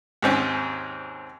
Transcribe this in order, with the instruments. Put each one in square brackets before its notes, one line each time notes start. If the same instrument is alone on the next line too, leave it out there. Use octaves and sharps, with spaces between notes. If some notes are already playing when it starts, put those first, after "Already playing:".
[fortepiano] D#2 G#2 C4 C#4